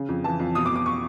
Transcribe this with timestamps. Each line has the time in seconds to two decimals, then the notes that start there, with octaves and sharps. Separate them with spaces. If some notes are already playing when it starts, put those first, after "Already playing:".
Already playing: C#3
0.09 F2
0.24 E3 A5
0.39 F2
0.55 B2 D#6
0.65 D6
0.70 B2
0.76 D6
0.86 C#6